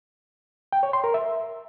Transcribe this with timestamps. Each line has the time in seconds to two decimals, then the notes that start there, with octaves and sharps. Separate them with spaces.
0.73 G5
0.83 C#5
0.93 C6
1.04 A#4
1.14 E5